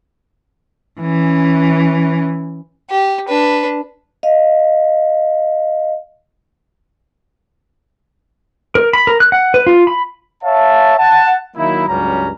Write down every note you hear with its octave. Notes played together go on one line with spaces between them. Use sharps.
E3 C#4
G4
D4 B4
D#5 F5
A#4
B5
A#4
F#6
F#5
B4
F4
B5
C#5 E5 F5 A5
F#5 A5
D#3 F#3 A#3 D#4 E4
C#2 G2 F#3 G3 C#4 A#5